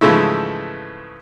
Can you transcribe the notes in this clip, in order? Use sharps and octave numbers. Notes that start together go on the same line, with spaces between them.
G#2 C#3 E3 F3 A3 E4